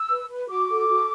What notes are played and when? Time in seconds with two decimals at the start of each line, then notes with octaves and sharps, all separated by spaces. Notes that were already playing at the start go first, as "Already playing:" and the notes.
Already playing: E6
0.10 B4
0.30 B4
0.49 F#4 D6
0.69 A4
0.89 F#4